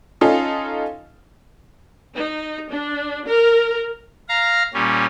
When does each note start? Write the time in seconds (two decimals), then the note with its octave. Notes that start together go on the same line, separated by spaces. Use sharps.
0.21 C#4 D#4 F4 A4
2.15 D#4
2.69 D4
3.26 A#4
4.29 F5 A#5
4.74 A#2 G3 C#4